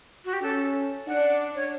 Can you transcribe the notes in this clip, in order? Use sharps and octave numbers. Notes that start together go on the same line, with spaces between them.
F#4
G4
C#4 A4
D4 F#5
C#5